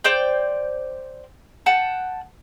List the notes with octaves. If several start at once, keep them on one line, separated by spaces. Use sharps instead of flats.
C5 D5 G5
F#5 G5 A5